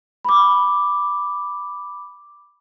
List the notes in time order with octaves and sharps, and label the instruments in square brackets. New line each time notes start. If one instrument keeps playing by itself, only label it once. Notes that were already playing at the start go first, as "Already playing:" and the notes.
[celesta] B5 D6